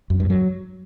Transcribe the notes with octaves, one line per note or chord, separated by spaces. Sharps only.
F#2
G2
F#3